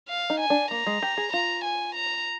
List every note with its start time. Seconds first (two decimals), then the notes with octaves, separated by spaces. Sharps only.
0.09 F5
0.30 D#4
0.40 G#5
0.50 D4
0.71 A#3 A#5
0.87 G#3
1.03 G4
1.17 G#4
1.33 F4 A#5
1.65 G#5
1.95 A#5